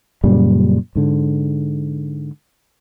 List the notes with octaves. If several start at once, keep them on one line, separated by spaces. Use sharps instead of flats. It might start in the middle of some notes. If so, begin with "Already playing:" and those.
F#2 A#2 C#3 G3
G#2 D3